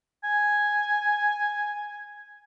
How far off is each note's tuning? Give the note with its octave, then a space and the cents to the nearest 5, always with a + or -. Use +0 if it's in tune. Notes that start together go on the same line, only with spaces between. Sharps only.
G#5 +0